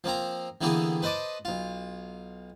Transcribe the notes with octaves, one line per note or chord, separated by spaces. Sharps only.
F3 A#3 C4 A#5
D3 E3 A#3 B3 G4 G#4
B4 C5 D#5 A5 D6
B1 F4